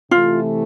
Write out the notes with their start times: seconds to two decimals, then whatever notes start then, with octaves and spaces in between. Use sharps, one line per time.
0.11 C3 E3 A3 F4